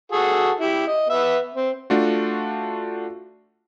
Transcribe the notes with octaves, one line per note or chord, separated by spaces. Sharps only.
F#4 G#4 A4
E4 G4
D#5
B3 E5
C4
A3 D4 F4 F#4